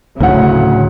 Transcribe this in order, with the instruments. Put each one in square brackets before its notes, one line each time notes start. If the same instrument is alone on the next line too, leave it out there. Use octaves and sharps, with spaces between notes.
[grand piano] D1 F#5 [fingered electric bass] D2 [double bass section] A2 C#3